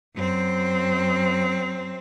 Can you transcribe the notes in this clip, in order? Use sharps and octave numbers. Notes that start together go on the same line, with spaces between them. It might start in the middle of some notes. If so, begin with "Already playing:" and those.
F#2 C4